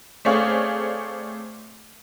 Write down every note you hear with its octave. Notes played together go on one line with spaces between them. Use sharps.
A3 C4 G#4 C#5 D5 F5